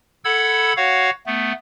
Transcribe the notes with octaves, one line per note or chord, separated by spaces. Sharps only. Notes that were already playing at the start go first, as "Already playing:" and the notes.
A4 F#5 B5 E6 G#6
F#4 C#5 F5 F#5
A3 B3